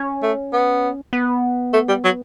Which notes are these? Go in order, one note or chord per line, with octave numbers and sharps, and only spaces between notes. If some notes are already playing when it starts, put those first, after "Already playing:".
Already playing: C#4
A3
B3
B3
A3
G3
F#3